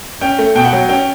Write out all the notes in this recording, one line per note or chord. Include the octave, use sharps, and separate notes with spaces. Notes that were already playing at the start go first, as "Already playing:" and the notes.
C#4 G5
A3
B2 G5
F#5
F#3 G5
C#4 G5